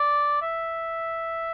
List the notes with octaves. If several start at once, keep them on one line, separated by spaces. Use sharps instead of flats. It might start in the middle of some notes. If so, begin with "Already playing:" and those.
Already playing: D5
E5